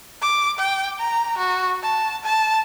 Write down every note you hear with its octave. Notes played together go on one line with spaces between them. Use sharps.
D6
G5
A#5
F#4
A5
A5